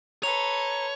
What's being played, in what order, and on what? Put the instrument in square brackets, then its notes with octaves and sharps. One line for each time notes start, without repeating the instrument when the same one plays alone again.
[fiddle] A4 B4 [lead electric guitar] C#5 [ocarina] A#5 [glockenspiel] F7